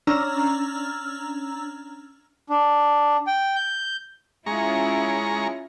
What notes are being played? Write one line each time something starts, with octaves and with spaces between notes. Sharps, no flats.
C#4 D4 A#5 E6 F6
D4
G5
G6
G#3 C#4 E4 F4 A#5 C#6